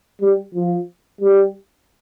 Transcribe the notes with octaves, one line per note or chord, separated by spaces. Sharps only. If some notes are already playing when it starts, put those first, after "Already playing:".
G3
F3
G3